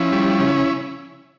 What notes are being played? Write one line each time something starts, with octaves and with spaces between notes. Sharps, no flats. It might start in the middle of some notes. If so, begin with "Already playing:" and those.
Already playing: F3 C#4 E4
G3
C#3